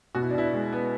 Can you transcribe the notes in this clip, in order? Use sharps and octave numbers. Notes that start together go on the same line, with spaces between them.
B2 F#4
E4
D4
B2 E4
G#3
B3